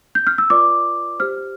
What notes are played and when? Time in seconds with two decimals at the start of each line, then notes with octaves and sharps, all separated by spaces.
0.15 G6
0.27 F6
0.38 E6
0.50 F4 B4 D5 D6
1.19 G4 C5 F6